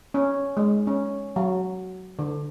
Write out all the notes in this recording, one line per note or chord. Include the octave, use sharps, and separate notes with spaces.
C#4
G#3
C#4
F#3
D3